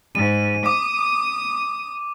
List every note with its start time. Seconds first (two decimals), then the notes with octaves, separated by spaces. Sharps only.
0.15 G#2 D#7
0.66 D6 D#6